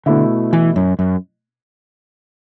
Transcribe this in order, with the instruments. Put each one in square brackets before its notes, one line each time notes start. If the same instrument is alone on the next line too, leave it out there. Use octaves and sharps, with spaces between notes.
[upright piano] B2 A3 E4 [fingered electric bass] D3
[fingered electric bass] E3
F#2
F#2